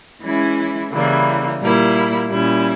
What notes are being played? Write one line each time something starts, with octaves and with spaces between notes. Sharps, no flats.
E3 G#3 C#4 E4
C#3 E3 G3 A#3
A#2 G3 A#3 E4
A#2 G3 C#4 E4